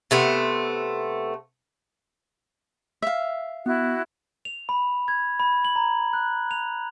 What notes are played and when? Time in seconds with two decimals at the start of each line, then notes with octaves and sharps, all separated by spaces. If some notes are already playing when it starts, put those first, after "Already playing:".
0.11 C3 A3 B3
3.02 E5 F5
3.66 B3 E4 F#4 F#6
4.45 F7
4.69 B5
5.08 G#6
5.40 B5
5.65 F#7
5.76 A#5
6.13 F#6
6.51 F7